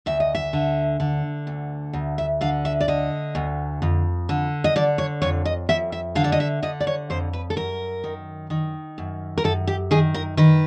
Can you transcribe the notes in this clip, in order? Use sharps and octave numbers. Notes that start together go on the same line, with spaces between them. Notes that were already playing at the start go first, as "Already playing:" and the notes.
D2 E5
D#5
E5
D3
D3
D2
D2
E5
D3 F5
E5
D5
D3 D#5
D2
F2
D3
D#5
D3 D5
C#5
F2 C#5
D#5
F2 E5
E5
D3 F5
D5
D#5
E5
D3 D#5
D5
C#5
F2 C5
B4
A4
F#2 A#4
D#3
D#3
F#2
A#4
F#2 A4
G4
D#3 G#4
A#4
D#3 B4